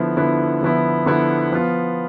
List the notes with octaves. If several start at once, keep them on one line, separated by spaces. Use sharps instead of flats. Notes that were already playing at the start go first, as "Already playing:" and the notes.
Already playing: D3 F3 B3 E4
D3 F3 B3 E4
D3 F3 B3 E4
D3 F3 B3 E4
F3 B3 F4